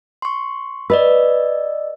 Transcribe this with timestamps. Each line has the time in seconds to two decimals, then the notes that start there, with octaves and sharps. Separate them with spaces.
0.22 C6 C#6
0.90 B4 D5 D#5 E6